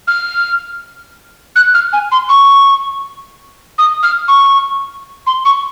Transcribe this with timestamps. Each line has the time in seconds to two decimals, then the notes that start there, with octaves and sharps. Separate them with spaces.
0.08 F6
1.56 F#6
1.74 F6
1.93 G#5
2.12 C6
2.29 C#6
3.78 D#6
4.03 F6
4.28 C#6
5.27 C6
5.45 C#6